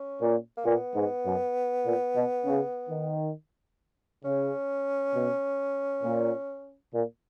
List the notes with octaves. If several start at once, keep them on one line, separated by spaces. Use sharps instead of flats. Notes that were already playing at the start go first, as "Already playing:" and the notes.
Already playing: C#4
A#2
A#3
A#2 B3
G#2
F#2
A#2
B2
C#3
D#3
C#3 C#4
B2
A#2
A#2